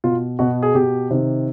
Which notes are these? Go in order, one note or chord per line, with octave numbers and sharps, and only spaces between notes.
B2 F4
B2 F#4
G#4
B2 G4
C3 D#3